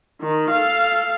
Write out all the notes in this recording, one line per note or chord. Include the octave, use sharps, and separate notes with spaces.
D#3
A4 F5